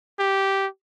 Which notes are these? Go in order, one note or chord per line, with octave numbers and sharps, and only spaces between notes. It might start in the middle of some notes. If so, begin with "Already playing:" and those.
G4